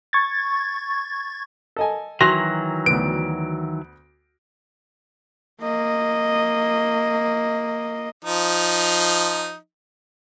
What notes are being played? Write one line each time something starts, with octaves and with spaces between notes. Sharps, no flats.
C#6 G#6 A6
A4 D#5 G#5
D#3 E3 F#3 F#4 A#6
D2 B3 D7
A#3 D#5
F3 D#4